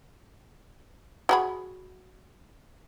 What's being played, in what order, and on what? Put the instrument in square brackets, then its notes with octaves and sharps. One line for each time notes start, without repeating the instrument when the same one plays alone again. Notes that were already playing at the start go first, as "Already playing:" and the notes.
[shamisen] F#4 G#4 B5